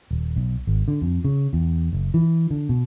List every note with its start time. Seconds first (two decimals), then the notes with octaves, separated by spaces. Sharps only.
0.11 D#1
0.36 B1
0.67 G#1
0.88 D3
1.01 F2
1.25 C#3
1.53 E2
1.93 F#1
2.14 E3
2.50 D3
2.69 B2